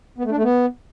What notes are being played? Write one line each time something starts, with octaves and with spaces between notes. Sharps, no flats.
B3
A3
D4
A3
B3